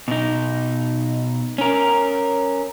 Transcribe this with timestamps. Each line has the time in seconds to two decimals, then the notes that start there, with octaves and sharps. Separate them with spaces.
0.08 B2 D#4
1.58 C#4 A#4